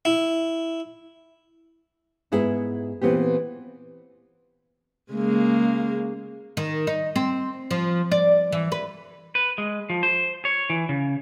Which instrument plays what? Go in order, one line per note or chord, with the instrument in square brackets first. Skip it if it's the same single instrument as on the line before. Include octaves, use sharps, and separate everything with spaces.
[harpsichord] E4
[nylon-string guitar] G#2 B3 E4 G#4
A#2 E3 B3 C4 G4
[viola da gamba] C#3 G#3 A#3
[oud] D#3
D#4
C4
F3
D5
E3
B4
[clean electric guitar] B4
G#3
F3
C5
C#5
E3
C#3